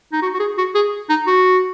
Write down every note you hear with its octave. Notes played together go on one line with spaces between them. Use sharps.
D#4
F#4
F#4
G#4
F#4
G#4
D#4
F#4